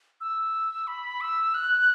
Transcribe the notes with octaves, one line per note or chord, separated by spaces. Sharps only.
E6
B5
E6
F#6